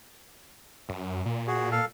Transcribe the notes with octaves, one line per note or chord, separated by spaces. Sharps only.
F#2
A#2
F#4 G#4
A4 F5